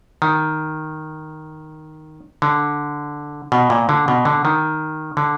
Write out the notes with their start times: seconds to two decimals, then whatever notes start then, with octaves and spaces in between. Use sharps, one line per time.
0.22 D#3
2.42 D3
3.52 B2
3.70 A#2
3.89 D3
4.08 B2
4.25 D3
4.45 D#3
5.17 D3